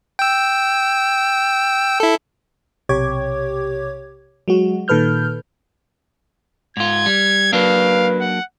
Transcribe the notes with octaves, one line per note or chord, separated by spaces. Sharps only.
G5 E6
E4 A4
B1 C3 G4 C#5 D6 G#6
F#3 G#3 F#4
A#2 D#3 A4 B4 F6 G6
G#2 F4 G#6
G3
F#3 A#3 D4 B4 F5
F#5